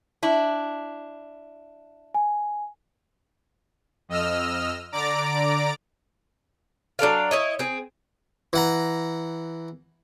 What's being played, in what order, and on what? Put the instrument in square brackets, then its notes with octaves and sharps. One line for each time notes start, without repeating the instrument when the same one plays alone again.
[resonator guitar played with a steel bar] D4 E4
[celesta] G#5
[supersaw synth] F2 D#5 E6 F6
D3 D5 A#5 D6 D7
[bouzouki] F#3 D4 A4 F5
E4 C#5 D#5
C4 G#4
[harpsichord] E3 F#5 A#5